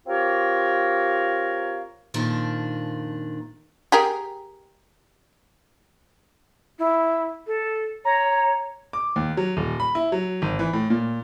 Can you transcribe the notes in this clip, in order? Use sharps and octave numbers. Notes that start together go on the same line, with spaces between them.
C4 F4 G4 A#4 C#5 F5
F2 A#2 D#3 F3 D4
G4 G#4 A#4
E4
A4
C#5 A#5
D6
D#2
F#3
D#1
B5
E4
F#3
G#1
E3
A2
A#2